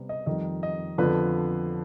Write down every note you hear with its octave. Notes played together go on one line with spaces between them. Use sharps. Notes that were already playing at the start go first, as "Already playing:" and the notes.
Already playing: C3 G3 B3
D#5
F2 D#3 G3 D#5
D#5
F2 D3 F3 B3 B4